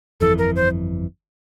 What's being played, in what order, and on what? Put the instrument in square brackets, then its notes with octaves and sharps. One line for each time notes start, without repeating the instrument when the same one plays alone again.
[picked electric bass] G1 F2 E3 [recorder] A4
[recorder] A#4
C5